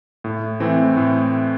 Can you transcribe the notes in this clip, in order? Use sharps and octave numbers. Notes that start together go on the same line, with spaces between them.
A2
E3 A3 C4
A2